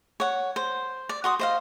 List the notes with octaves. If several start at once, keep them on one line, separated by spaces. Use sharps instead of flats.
C#5 F#5
C5
D5
F#4 C6 D#6
C5 D#5 F5